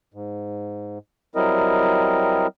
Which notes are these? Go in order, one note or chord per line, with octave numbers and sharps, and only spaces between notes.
G#2
F#3 G3 C4 E4 A#4 D#5